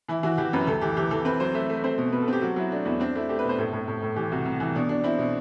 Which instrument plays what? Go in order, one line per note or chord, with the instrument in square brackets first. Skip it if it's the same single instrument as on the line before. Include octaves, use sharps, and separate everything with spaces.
[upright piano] E3 E4
E3 F#4
E3 G4
F#2 B4
D2 A4
E3 G4
E3 G4
E3 A4
C4 B4
F#3 C5
A3 E5
A3
C4 C5
B2
B2 B4
A4
C4 G4
F#3 F#4
F#3 E4
A3 D4
E2 E4
C4 D4
A3 E4
A3 G4
B4
B2
C5
A2 A4
A2
A2
A2
E3 G4
C2 F#4
C2
E3
B2 D4
B2 D4
C4 E4
B2